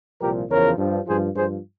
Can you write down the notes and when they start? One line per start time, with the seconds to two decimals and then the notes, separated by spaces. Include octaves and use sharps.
0.21 C2 A#2 F3 G4 A#4
0.50 E2 C#3 F3 A#4 C#5
0.78 G2 F3
1.07 G2 F3 G#4 C5
1.35 G2 F3 G#4 C5